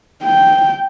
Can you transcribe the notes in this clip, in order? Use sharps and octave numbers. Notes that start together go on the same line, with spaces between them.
G5